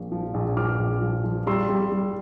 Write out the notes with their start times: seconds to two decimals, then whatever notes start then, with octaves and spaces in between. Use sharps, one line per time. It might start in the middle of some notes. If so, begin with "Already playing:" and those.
Already playing: A#1 A#2
0.12 F3
0.34 A#1
0.57 F3 D6 F6
0.79 A#1
1.01 F3
1.24 F3
1.47 G3 C6 E6
1.69 G3
1.92 G3